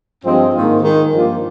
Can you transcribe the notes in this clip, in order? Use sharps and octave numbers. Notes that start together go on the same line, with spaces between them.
G2 F3 G#3 C4
G#2 D#3 A#3 F4
D#3 G#3 D#4
G2 F3 A#3 F4